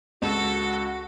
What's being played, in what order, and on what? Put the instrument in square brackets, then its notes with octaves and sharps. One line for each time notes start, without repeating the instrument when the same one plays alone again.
[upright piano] C#2 [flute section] F#4 [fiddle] A4